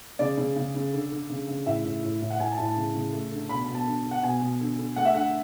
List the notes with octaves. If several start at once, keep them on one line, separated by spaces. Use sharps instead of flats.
C#3 D5
C#3
C#3
C#3
D3
D3
C#3
C#3
A2 E5
A2
A2
A2
F#5
A2 G#5
A5
A2
A5
C#3
C#3
A3
D3
B2 B5
B5
B2
A5
D3
D3
F#5
B2 G#5
B2
D3
D3
A3 F#5
E5
D3 F#5